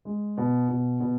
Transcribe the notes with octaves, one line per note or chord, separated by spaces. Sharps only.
G#3
B2
B2
B2